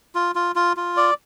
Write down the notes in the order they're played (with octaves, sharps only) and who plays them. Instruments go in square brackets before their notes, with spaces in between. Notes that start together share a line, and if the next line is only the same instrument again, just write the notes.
[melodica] F4
F4
F4
F4
D5